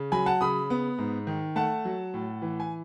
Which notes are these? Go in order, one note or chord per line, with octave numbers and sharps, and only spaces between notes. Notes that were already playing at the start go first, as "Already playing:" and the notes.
Already playing: C#3
F#3 G#5 B5
F#5 A5
C#3 B5 D#6
B3
G#2
D#3
A3 F#5 A5
F#3
A2
E3
G#5